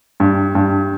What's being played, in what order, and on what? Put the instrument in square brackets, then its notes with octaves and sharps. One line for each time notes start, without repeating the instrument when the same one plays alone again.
[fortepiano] G2
G2